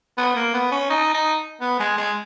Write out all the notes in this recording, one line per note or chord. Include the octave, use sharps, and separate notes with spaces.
B3
A#3
B3
C#4
D#4
D#4
B3
G#3
G#3